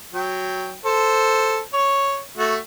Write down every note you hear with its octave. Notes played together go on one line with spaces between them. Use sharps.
F#3 G5
A4 C5
C#5
A3 F#4